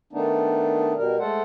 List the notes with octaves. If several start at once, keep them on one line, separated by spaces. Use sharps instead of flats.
D#3 A3 B3 D4 D#4
B2 G3 A#4
G#3 A3 A4 C5 F#5